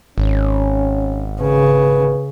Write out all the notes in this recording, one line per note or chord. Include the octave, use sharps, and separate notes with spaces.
G#1 C#4
C#3 B4